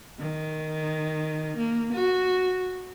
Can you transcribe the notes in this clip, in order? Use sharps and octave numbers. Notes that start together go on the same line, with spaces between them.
D#3
A#3
F#4